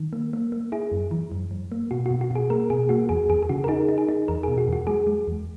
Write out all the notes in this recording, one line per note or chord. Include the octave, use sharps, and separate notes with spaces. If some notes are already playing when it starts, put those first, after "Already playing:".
Already playing: D#3
A#3
A#3
A#3
E4 G#4
F#2
E3
F#2
F#2
A#3
B2 F#4
B2 F#4
F#4
B2 G#4
A#3 A#4
B2 G#4
A#3 F#4
E2 G#4
E2 G#4
G#4
C#3 F#4
A#4
D#4 G#4
D#4
G#4
D#4
E2 A#4
B2 G#4
F#4
E2 F#4
G#3 G#4
G#3
E2